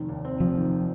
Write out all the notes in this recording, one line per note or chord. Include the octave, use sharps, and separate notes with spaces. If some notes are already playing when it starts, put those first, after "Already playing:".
Already playing: F1 D#3
D#2
C4
F1 F3
D#3